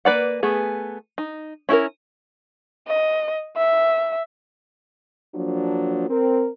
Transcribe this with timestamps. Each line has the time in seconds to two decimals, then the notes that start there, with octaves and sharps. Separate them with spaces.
0.05 A#3 B4 D5 F#5
0.43 A3 B3 G#4
1.18 D#4
1.69 C#4 E4 G#4 A#4
2.88 D#5
3.57 E5
5.34 F3 F#3 A#3 D4
6.10 C4 A#4